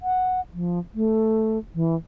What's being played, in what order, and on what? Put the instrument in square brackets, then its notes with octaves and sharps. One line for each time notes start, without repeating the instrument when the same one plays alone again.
[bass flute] F#5
F3
A3
E3